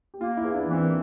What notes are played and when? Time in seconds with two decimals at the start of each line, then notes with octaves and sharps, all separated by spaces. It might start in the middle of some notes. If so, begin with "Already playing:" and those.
0.14 G4
0.20 A#3 F4
0.37 E4
0.43 E2
0.54 D4
0.66 E3
0.72 C4
0.82 A#3